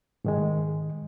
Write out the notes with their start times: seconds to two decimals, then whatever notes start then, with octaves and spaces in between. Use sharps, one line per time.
0.25 G#2 D#3 G#3